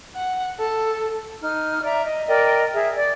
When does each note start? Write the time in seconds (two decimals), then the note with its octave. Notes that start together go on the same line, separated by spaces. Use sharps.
0.15 F#5
0.60 A4
1.42 D#4 F6
1.83 D5 E5 A#5
2.05 D#5
2.27 A#4 D5 D#5 G5
2.74 G#4 E5
2.96 D5